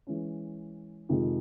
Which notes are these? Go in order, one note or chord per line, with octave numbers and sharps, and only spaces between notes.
E3 G#3 C#4
F2 C3 D#3 G#3